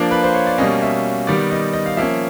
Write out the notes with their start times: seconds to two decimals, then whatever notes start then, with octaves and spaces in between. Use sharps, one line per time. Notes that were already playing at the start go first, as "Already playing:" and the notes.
Already playing: F3 A#3 D4
0.11 B4
0.24 C5
0.34 C#5
0.47 D5
0.58 B2 G3 A#3 C#4 D#5
0.82 E5
1.27 D#3 G3 B3 D5
1.51 D#5
1.73 D#5
1.86 F5
1.97 F3 A#3 C#4 E5